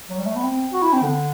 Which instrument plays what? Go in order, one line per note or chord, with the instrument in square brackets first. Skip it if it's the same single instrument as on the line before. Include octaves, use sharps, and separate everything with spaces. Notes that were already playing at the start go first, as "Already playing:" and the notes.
[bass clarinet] F#3
G3
A3
B3
C4
F#4
E4
C4
D3